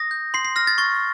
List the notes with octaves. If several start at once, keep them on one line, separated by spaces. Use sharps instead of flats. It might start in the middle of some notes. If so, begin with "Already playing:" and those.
Already playing: D#6 A#6
G6
C6 C7
C7
F6 A#6
A6
C#6 A6